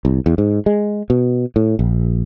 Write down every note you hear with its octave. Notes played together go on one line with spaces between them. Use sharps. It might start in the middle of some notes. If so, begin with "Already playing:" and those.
C2
E2
G#2
G#3
B2
A2
A#1